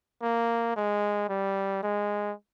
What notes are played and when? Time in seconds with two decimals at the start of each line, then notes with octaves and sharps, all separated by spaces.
0.22 A#3
0.77 G#3
1.29 G3
1.83 G#3